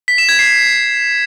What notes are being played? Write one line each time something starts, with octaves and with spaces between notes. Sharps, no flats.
B6
E7
G#6
C7